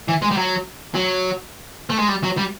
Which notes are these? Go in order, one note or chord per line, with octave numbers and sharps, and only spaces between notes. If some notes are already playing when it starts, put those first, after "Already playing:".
E3
G#3
G3
F#3
F#3
A3
G#3
G3
F#3
G3